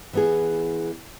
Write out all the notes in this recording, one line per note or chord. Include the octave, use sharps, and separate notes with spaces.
E3 B3 G#4